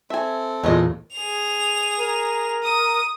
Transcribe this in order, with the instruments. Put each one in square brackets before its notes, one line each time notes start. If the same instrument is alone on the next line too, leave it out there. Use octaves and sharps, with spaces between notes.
[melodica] C4 A4 [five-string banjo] E5 G#5
[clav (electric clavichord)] E2 A#2 [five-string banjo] G#3 F4 D#5
[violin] G#4 F7
[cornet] A#4
[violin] D#6